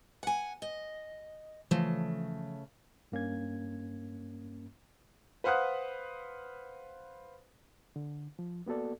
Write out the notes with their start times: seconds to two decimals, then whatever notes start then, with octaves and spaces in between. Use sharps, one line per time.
0.23 F#5 G#5
0.62 D#5
1.71 C#3 E3 F3 A3
3.12 G2 A#3 C#4 G#6
5.44 B4 C5 F5 F#5 D#6 F#6
7.96 D3
8.39 F3
8.66 A#3 B3 F#4 A4 D5